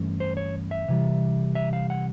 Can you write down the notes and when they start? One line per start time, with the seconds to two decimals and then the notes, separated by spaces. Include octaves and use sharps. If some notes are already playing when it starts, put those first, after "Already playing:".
Already playing: G2 E3 A3 C#4
0.20 C5
0.37 C#5
0.71 E5
0.88 C3 E3 G3
1.55 E5
1.73 F5
1.90 F#5